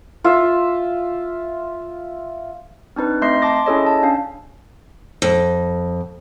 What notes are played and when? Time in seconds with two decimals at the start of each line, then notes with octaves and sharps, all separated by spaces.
0.24 F4 E5
2.96 C4 D4 D#4 B4
3.22 A3 C4 D#5 C6 G6 C7
3.42 A5 C6 D6 A#6
3.66 C#4 E4 G#4 A4 C#5 D#5
3.86 A5
4.03 C#4 D4 F5
5.22 F2